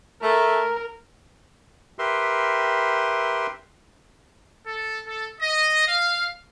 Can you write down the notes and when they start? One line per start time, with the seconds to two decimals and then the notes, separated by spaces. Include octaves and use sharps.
0.22 A3 A#4
1.99 G4 A#4 B4 E5 C6
4.67 A4
5.07 A4
5.40 D#5
5.87 F5